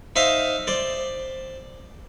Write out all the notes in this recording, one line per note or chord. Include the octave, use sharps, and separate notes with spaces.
D#4 C5 E5 F5 D#6
C5 D5